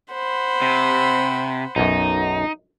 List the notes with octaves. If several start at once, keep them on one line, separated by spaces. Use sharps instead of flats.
C5 F#5 B5
C3
B1 F#2 D#4